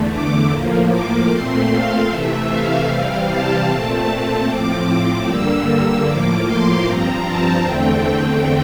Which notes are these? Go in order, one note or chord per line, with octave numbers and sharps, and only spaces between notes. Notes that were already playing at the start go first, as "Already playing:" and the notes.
Already playing: E2 D3 A3
D6
A2 F3 A#3
D6
A#2 A3 C4 C6
F5
C3 E3 A3 E5
F5
C3 E3 G3 C4 F5
A5
A#2 A3 C4 A5
A2 F3 C4 D6
G2 D3 G3 A#3 E6
E6
A2 F3 A#3 D6
C6
G2 F3 C4 A#5
A5
E2 D3 A3 C4 G5